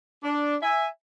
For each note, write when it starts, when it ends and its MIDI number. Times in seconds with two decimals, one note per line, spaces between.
0.24 0.57 62
0.62 0.87 76
0.62 0.87 80